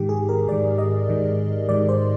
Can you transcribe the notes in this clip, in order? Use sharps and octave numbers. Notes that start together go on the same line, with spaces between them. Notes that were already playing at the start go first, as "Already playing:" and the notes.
Already playing: G#2 D#3 G4
G#4
A#4
G#2 D#3 D5
D#5
G#2 D#3
G#2 D#3 D5
C5